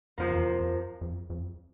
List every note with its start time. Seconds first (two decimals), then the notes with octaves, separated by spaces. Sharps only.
0.18 F2 C3 F3 A#3
0.32 E2
0.45 F2
0.60 F2
1.01 F2
1.30 F2